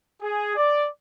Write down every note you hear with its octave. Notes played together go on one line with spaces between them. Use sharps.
G#4
D5